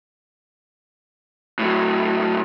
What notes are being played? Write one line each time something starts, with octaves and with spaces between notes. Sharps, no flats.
A2 F#3